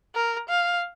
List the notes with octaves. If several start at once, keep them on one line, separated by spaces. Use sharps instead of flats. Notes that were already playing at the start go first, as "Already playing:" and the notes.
A#4
F5